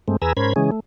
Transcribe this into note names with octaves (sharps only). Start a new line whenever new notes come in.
G2 G#3 A3 C4
E2 G#4 B4 G#5 A#5 E6
G#2 C#4 A#4 C5 B5 G#6
C#3 E3 G#3 C#4 G#4
A3